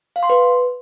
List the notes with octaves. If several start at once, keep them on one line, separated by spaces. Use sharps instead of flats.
F5
C6
B4